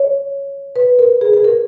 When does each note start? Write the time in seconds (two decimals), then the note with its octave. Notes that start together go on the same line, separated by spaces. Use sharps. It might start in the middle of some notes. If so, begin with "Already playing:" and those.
Already playing: C#5
0.76 B4
0.99 A#4
1.21 G#4
1.33 G#4
1.44 A#4